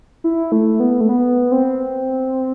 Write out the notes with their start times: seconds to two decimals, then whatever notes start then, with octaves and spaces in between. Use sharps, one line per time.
0.24 E4
0.52 A3
0.80 B3
1.01 A3
1.09 B3
1.52 C4